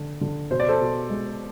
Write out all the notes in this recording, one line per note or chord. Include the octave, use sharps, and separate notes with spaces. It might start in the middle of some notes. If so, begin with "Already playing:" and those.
Already playing: D3
D3
B2 C5
D5
A4 C5
B2
G#3